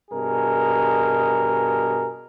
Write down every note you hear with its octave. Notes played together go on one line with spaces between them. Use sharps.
G2 B2 G#4 A#4